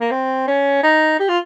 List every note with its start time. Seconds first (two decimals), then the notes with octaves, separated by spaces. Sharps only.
0.01 A#3
0.11 C4
0.47 C#4
0.83 D#4
1.19 G4
1.29 F4